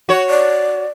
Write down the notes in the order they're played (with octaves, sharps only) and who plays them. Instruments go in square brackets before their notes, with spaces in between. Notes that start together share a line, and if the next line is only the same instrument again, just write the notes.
[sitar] F#4 C#5
[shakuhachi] D5